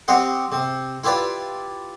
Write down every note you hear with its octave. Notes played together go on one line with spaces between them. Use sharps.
C4 G4 C5 D#5 F#5
C3
E4 F4 G4 B4 D5